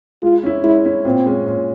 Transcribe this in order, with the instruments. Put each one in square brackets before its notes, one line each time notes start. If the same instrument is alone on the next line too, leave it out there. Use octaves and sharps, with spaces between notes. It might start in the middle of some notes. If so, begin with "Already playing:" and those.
[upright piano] G#3 [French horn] F4
[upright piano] C#4 E4
[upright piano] G#3 [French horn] E4
[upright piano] C#4 E4
[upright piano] A#2 [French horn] C4
[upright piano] G#3 C#4
A#2